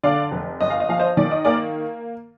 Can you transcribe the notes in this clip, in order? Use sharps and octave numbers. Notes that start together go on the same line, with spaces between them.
D3 D5 F5
F1
G1 D#5
F5
D#5
F3 F5
C5 D#5
D#3 D5
D#5
A#3 A#4 D5